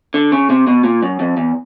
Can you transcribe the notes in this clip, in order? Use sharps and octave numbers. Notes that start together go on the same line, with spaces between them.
D3
C#3
C3
B2
A#2
F#2
F2
E2